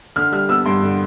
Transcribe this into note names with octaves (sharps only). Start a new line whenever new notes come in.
D3 F6
G3 F6
B3 E6
G2 C6
D3